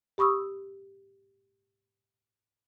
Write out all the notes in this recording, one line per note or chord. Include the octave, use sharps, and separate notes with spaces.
G4 B5 C#6 D#6 E6